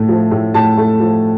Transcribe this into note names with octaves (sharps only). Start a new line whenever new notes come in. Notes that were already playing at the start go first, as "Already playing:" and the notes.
Already playing: A2 A3
F3
A2
A2 A5
A3
F3